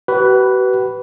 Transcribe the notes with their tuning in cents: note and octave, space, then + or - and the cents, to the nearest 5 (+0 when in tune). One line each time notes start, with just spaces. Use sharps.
F#4 +45 B4 +0